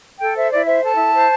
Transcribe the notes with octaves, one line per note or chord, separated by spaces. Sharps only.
A4 G5
C5 E5
E4 D5
C5 E5
A4 A5
E4
C5